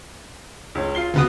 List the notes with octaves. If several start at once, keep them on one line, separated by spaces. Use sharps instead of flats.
C#2 C#4
F4 C7 G7
D2 C#3 F#3 B3 F#4 D#6